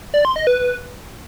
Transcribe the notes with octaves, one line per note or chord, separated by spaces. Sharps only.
D5
C6
D#5
B4